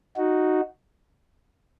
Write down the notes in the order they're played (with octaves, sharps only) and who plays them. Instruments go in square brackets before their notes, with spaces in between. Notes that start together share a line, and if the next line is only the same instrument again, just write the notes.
[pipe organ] D#4 F#4